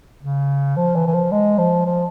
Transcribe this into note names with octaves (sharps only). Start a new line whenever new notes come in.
C#3
F3
E3
E3
F3
G#3
F3
F3